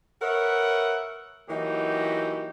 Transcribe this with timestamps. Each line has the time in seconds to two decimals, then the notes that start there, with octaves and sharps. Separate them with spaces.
0.22 A#4 B4 C#5 E5 F#5
1.49 E3 F#3 A#3 D#4 F#4 G4